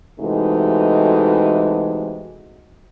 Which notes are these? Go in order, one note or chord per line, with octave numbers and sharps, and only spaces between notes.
C3 E3 G#3 A3 D#4 F#4